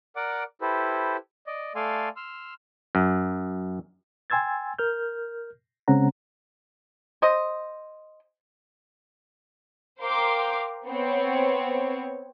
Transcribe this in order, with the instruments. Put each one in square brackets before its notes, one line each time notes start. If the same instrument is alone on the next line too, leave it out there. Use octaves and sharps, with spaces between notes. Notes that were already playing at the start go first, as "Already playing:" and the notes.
[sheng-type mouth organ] A#4 D5 F#5 D6
E4 G4 A4 B4 C5
D5 D#5
A3 A4 D5 F5 G#5 C6
C6 E6 F6
[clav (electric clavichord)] F#2
[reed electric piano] G5 G#5 C6 E6 G#6 A6
A#4 F6 G6
C#3 G#3 C4 C#4 F#5 A#5
[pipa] C5 D#5
[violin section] A#4 C5 F5 G5 C6 D6
B3 C4 C#5